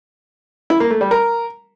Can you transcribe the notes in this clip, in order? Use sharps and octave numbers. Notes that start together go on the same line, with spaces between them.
E4
A#3
A3
G3
A#4